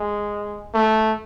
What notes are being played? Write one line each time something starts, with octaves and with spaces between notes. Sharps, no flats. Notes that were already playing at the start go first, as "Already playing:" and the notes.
Already playing: G#3
A3